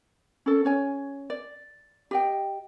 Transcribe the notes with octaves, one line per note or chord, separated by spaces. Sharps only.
C#4 A4
C#4 C#5 G#5
D5
G4 D#5 G5